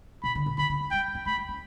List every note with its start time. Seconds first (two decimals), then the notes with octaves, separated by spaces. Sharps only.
0.23 B2 B5
0.35 D3
0.46 B2
0.58 D3 B5
0.69 D3
0.80 D3
0.91 G3 G5
1.15 C#4
1.26 A3 B5
1.37 D4
1.49 C#4